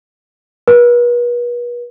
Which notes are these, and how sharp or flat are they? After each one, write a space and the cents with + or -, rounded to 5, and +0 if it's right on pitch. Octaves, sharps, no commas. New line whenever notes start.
B4 -40